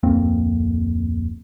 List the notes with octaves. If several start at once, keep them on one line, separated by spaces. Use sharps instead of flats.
D1 F2 A#3 C4